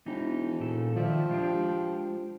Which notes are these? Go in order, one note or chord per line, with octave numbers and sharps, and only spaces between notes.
E1 E3 D#4
A#2 A4
D#3 F3 D5 E5
G#3 D4 G4